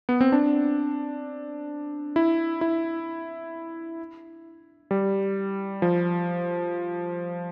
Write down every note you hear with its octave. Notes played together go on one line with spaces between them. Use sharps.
B3
C4
D4
E4
E4
G3
F3